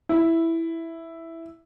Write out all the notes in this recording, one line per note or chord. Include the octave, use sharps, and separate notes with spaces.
E4